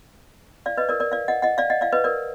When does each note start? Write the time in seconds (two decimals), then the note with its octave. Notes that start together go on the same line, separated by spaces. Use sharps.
0.66 D5 F5
0.77 B4 D#5
0.89 A#4 D5
1.00 A#4 D5
1.11 D5 F5
1.28 D#5 F#5
1.42 D#5 F#5
1.58 D5 F5
1.70 D#5 F#5
1.81 D5 F5
1.93 B4 D#5
2.04 A#4 D5